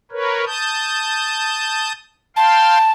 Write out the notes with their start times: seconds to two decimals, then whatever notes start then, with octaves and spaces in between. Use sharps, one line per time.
0.12 A#4 B4 C#5
0.46 A5 D#6 G6
2.36 F5 G5 A5 C6